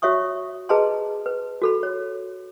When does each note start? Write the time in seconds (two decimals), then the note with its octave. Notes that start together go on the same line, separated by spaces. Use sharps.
0.02 F#4 C#5 E5 C#6 D#6
0.69 G#4 B4 D#5 A5 A#5 C6
1.26 B4
1.62 F#4 A4 B5
1.83 C#5